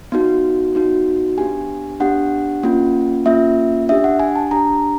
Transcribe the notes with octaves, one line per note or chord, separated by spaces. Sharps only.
B3 D#4 F#4
B3 D#4 F#4
B3 D4 G4 G#5
B3 D4 G4 F#5
A#3 C#4 F4
A#3 C#4 F4 E5
D4 G4 E5
F#5
G#5
A5
D4 G4 A#5